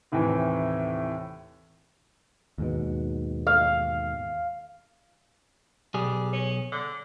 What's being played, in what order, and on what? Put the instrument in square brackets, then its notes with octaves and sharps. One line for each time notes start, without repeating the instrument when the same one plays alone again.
[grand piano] D#2 A2 C3 E3
[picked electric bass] D#2 G#2 B2
[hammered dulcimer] F5
[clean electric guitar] B1 G#4 [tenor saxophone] G3
[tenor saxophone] C#4
D3